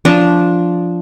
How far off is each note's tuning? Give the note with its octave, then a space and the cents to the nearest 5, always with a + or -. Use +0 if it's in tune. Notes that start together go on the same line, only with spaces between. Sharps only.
F3 +0 D4 -10